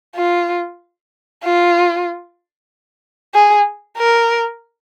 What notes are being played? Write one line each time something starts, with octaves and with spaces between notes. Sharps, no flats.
F4
F4
G#4
A#4